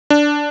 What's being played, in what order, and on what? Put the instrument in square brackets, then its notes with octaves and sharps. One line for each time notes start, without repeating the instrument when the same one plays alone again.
[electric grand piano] D4